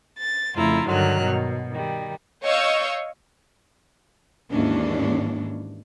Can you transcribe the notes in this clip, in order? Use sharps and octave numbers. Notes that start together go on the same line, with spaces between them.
A6
F2 C#3 A3 E4 F4 A#5
G2 D3 D#3 F#3 F6 F#6
B2
D#3 G3
C#5 D#5 F5 C#6 E6 G6
D#2 G#2 E3 C#4 D4